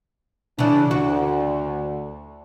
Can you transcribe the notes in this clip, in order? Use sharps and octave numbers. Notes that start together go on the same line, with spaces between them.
C#3 E3 D4
D2 F#4